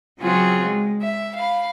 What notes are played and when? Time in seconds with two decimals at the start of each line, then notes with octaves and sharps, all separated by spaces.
0.19 C#3 F#3 C4 F4 F#4 G#4
0.65 G#3
1.01 E5
1.36 F5 B5